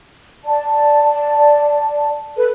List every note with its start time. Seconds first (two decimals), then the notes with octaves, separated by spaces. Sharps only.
0.44 D5 A5
2.37 A4 B4